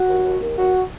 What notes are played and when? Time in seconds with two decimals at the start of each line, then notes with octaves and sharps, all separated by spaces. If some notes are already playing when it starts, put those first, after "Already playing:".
Already playing: F#4
0.08 D#2
0.25 D#2
0.41 D#2
0.58 D#2 F#4